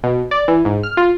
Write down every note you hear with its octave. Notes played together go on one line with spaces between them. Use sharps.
B2
D5
E3
G#2
F6
F4